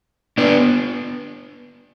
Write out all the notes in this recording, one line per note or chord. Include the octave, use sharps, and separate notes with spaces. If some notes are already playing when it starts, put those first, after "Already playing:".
B3 D4